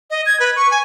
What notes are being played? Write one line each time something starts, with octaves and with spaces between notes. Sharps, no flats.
D#5
G#6
B4
C#6
G#5